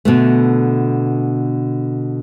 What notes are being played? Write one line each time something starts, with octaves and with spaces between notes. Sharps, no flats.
B2 D3 A3